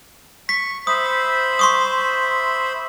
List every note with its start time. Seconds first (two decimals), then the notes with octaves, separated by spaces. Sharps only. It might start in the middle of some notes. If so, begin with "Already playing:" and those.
0.49 C#6 B6
0.87 C5 E5 B5 D#6
1.59 C6 C#6 D#6